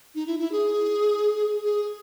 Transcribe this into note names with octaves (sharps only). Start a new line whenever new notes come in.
D#4
E4
E4
G#4
G#4